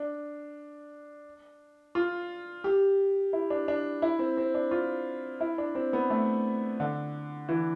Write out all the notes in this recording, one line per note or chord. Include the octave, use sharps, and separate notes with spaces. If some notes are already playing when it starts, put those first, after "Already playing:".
Already playing: D4
F4
G4
E4
D4
D4
E4
C4
C4
D4
F4
E4
D4
C4
B3
A3
D3
E3